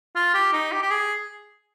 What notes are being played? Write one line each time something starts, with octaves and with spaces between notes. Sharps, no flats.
F4
G4
D#4
G4
G4
G#4